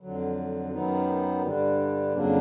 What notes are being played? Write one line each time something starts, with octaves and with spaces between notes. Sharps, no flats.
F2 D3 F#3
F#2 D#3 F#3 B3 D#4
G2 D3 G3
F2 C#3 F#3 A#3 D4